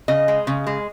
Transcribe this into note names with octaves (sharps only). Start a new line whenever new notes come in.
C#3 D#5
G#3
C#3
G#3